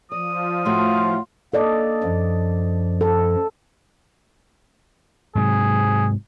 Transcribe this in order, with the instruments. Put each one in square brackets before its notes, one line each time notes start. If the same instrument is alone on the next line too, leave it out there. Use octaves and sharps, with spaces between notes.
[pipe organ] F3 [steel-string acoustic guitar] D5 [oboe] D#6
[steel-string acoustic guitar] A2 A3 F#4 [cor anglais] F4
[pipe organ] A#3 [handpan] A4 D5 D#5
[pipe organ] F#2 F3
[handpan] A4
[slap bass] G#2 C3 F#3 [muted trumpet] G#4